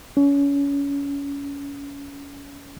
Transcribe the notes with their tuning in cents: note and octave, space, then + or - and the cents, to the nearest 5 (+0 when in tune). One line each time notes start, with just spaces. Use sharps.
C#4 +30